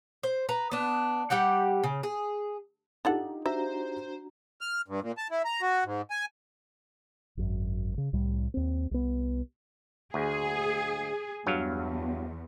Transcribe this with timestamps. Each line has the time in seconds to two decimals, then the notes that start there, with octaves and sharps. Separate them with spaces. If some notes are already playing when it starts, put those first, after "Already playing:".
0.23 C5
0.49 B4 A#5
0.72 B3 D4
1.30 G3 G4 F#5 G5
1.84 C#3
2.03 G#4
3.05 D4 D#4 F4 G4 A4 F#5
3.46 D4 F#4 C5 E5 A#5
4.61 F6
4.88 G2
5.01 A#2
5.18 A5
5.31 E4
5.45 A#5
5.62 F#4
5.85 G#2
6.10 G#5
7.37 G#1 F#2
7.98 C#3
8.13 C2 A2 G3
8.54 D#2 C4
8.91 C2 B3
10.14 D2 G#4
11.46 E2 G2 F#3 F5